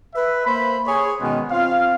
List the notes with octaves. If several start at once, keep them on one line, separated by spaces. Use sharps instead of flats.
B4 E5
A#3 C5 B5
G#4 C#5
B2 D#3 G#3 B3 C#4
C4 F4 F5